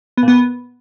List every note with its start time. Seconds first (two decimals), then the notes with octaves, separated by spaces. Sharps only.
0.17 B3
0.23 A#2
0.28 B3